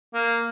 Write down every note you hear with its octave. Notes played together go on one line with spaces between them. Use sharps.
A#3